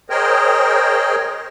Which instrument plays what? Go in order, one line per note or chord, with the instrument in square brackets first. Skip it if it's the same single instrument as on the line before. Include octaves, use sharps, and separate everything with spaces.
[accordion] G#4 A#4 C5 C#5 D#5 G5